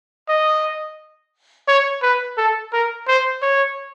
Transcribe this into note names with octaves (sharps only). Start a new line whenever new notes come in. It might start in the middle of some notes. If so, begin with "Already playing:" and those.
D#5
C#5
B4
A4
A#4
C5
C#5